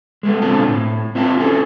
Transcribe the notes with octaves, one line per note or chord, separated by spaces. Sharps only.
G#3 A3 B3
B2 D3 C4 F4 A4
A2
C4 F4 E5 F5 G#5 A5
C#4 F4 G#4 A4